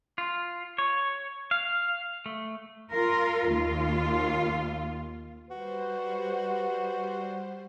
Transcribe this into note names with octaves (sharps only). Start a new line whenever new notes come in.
F4
C#5
F5
A3
F4 A#4
D#2 F4
G3 F#4 B4 C5